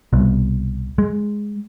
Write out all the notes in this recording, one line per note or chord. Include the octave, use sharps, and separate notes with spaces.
C2 B2
G#3